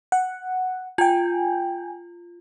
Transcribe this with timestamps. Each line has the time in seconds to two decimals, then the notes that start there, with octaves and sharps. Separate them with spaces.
0.12 F#5
0.98 F4 G5 G#5